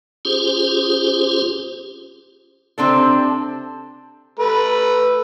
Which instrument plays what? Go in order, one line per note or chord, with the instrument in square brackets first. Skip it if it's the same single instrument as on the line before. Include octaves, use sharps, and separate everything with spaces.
[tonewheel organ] C#4 F4 G4 G#4 C5
[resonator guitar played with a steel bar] C3 C4 D4 A4
[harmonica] A3 B4